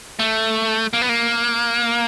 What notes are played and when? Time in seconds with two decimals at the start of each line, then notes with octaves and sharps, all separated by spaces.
0.19 A3
0.93 A#3
1.02 B3
1.09 A#3